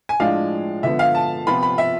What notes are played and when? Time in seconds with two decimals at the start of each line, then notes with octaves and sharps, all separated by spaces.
0.09 G#5
0.20 A2 F3 G#3 D4 F5
0.83 D3 F3 B3 E5
0.99 F5
1.15 A5
1.47 C3 F3 B3 F4 B5
1.63 B5
1.78 E5